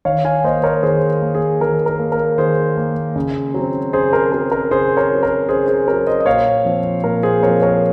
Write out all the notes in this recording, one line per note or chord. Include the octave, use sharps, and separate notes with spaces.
D#3 C#5 F5
F5 G#5
A#3 C5 D#5
A#4 C#5
D#3 G#4 C5
A#3
G#4
D#3 A#4
A#4
A#3
A#4
D#3 G#4 C5
A#3
C#3
F#3 C4
C#3 G#4 C5
A#4
F#3 C4 A#4
A#4
C#3 G#4 C5
A#4 C#5
F#3 C4
A#4
C#3 G#4 C5
G#4 C5
F#3 C4 A#4 C#5
C5 D#5
D#5
A#2 C#5 F5
F3 C4
A#2 A#4
G#4 C5
F3 C4 A#4 C#5
A#4 C#5